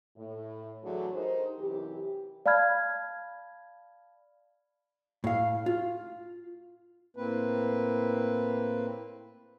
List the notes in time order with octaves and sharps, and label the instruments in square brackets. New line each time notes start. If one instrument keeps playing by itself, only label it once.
[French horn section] A2
D3 E3 F#3 A3 D4 G#4
D#4 G4 A#4 C5
F#2 C3 E3 G4
[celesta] D5 F5 A5 B5 F6 G#6
[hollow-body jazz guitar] A2 F5
F4
[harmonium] A2 A#3 C4 B4